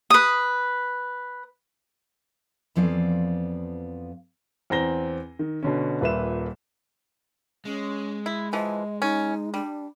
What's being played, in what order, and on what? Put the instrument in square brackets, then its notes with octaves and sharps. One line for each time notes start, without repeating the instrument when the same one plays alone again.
[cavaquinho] B4 D#6
[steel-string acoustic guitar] F2 E3 F3 B3 D5 F5
[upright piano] E2 C4 A#5 A#6 G7
D#3
B2 D3 C#4
D#1 A#2 B4 E5 E7
[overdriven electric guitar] G#3 [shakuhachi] C#4
[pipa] E4
[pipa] E3 F3 [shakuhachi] D#5
[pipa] C#4 [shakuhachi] D#4
[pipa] G3 [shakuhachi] D4